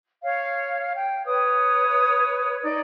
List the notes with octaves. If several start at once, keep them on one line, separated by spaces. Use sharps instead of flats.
C#5 F5
G5
B4 C#5 D#6
D#4 D5